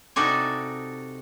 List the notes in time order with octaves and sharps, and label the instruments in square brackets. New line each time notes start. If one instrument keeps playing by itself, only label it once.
[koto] C3 D#4 F#4 A4 D5 G#5